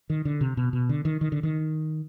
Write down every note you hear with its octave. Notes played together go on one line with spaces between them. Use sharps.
D#3
D3
C3
B2
B2
D3
D#3
D#3
D3
D#3